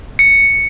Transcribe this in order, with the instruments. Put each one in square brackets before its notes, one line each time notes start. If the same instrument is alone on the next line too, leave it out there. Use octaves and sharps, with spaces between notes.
[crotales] C#7